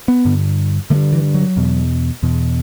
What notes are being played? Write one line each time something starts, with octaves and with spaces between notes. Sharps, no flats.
B3
G2 D3
G2 D3 A3
E3
F#3
E2 B2
E2 B2